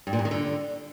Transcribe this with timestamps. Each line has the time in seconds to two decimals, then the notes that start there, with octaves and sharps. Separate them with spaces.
0.07 G2
0.13 A#2
0.19 G2
0.25 D#3
0.31 D3